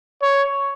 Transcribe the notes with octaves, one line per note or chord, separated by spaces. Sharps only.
C#5